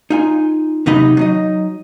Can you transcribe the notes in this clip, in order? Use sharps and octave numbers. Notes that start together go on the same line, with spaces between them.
D#4 F4 G#5
D#2 C3 F#3 D#4 D#5 B5
F#3 D#4 D#5